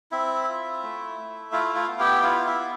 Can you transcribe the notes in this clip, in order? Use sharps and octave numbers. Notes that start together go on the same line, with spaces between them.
C4 E4 E5
F4
A3
A3
E4 F4 F5
F4 F5
B3
G4 G5
E4 F4 F5
E4 E5
B3